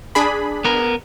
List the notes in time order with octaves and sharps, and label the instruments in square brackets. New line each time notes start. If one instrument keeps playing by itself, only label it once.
[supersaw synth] D4 G#4 B5
[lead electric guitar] B3 A#4